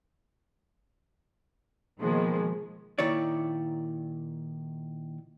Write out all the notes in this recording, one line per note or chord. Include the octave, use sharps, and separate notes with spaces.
B2 D#3 F3 G#3 A#3
A#2 D#3 E4 C#5 D5